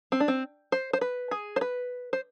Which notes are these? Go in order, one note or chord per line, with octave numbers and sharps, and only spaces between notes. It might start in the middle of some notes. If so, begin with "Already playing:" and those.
C4
D4
C4
C5
C5
B4
G#4
C5
B4
C5